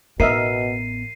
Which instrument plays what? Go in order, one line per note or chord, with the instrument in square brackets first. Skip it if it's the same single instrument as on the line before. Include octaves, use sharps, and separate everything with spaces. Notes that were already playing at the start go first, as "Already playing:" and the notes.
[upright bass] A1 B3 [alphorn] B2 [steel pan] A#4 D#5 E5 [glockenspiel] C7 D#7